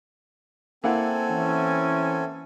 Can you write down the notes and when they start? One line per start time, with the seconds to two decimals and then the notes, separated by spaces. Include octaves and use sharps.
0.84 A#3 C4 E4 A4 F#5 G#5
1.30 E3 C#4